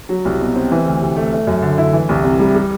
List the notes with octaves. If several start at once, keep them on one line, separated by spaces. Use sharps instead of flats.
F#3
C2
B2
C4
E3
D2
C3
A3
A3
F#2
D3
E4
E3
C2
C3
G3
G3